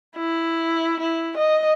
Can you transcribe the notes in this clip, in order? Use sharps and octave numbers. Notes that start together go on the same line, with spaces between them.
E4
E4
D#5